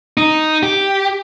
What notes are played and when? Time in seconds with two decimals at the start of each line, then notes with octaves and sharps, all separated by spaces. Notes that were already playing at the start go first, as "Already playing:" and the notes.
0.17 D#4
0.63 G4